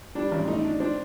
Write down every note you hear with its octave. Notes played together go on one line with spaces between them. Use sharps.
G3 D4
A1
A3 D#4
D4
C4 D4